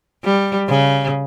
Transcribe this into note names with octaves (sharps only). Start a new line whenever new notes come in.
G3
C#3